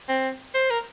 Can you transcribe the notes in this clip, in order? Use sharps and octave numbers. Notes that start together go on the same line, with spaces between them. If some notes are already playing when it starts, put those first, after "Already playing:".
C4
C5
A#4